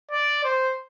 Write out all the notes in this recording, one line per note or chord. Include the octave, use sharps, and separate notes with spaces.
D5
C5